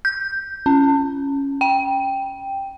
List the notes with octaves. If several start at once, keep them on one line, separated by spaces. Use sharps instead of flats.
G6
C#4
G5